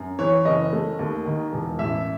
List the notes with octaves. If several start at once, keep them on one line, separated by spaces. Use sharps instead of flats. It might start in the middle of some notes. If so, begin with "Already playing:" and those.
Already playing: F#2
E3 C#5
F#1 D#5
A3
D#2
D#3
E1
A1 E5